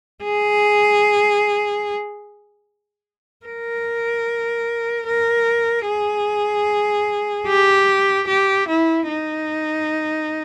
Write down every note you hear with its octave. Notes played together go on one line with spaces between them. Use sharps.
G#4
A#4
A#4
G#4
G4
G4
E4
D#4